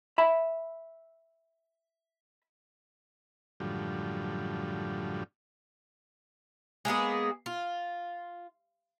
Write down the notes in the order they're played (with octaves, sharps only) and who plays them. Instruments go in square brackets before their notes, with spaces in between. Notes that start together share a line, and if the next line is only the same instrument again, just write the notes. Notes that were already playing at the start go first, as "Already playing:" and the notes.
[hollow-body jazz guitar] E5 B5
[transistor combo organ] F#2 A2 D3 F3 G3
[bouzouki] G#3 A#3 B3 G#4
F4